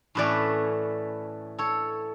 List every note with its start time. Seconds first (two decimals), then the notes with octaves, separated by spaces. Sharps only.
0.15 A2 E3 A3 C#4 B4 D5
1.58 A4 C#5